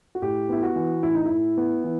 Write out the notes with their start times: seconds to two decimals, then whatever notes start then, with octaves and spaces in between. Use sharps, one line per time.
0.15 F#4
0.22 A2 G4
0.49 B3 E4
0.63 F#4
0.76 E3
1.03 A2 E4
1.14 D#4
1.26 A2 E4
1.57 B3
1.84 E3